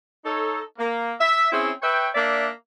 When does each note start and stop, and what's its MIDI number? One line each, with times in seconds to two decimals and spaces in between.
0.24 0.60 63
0.24 0.60 69
0.24 0.60 73
0.78 1.12 58
1.19 1.51 76
1.51 1.70 60
1.51 1.70 61
1.51 1.70 64
1.51 1.70 68
1.51 1.70 72
1.51 1.70 76
1.81 2.07 71
1.81 2.07 73
1.81 2.07 76
1.81 2.07 79
2.14 2.47 58
2.14 2.47 62
2.14 2.47 74
2.14 2.47 76